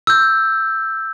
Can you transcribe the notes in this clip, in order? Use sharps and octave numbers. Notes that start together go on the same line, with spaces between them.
E6 G6